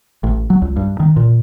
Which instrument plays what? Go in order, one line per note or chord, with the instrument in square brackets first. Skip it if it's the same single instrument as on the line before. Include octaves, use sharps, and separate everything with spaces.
[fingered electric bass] A1
F#3
C#2
G2
D#3
A#2